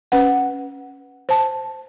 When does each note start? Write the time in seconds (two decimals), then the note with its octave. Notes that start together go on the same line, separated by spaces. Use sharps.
0.12 C#4 B4 F#5
1.29 C5 A5